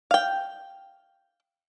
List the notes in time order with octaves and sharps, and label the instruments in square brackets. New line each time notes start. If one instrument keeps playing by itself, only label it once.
[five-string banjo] F5 G5